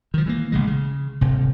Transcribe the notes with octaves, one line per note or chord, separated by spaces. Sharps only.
D#3 F3
E3 G3 A#3
A1 C#3 G#3
C#3
D#1 G#1 C3